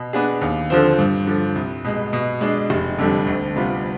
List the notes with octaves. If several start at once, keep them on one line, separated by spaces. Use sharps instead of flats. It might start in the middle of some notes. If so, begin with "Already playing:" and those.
Already playing: B2
B3 D4 G#4
D#2
D3 F3 C4
G2
D3 F3
C2
B2 G#3
B2
G#3 D4
F1
F2 D3 G3
D2
C3 G3 B3 F4